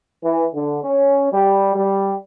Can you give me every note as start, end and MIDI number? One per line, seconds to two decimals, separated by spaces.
0.22 0.44 52
0.54 0.79 50
0.84 1.30 61
1.31 1.72 55
1.75 2.12 55